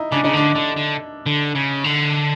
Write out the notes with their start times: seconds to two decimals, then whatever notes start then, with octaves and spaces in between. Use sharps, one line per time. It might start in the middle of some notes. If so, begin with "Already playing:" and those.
Already playing: D#4 E4
0.12 C#3 D4
0.24 C#3 D#4
0.34 D3 D4
0.56 D3 D4
0.77 D3
1.26 D3
1.55 C#3
1.84 D3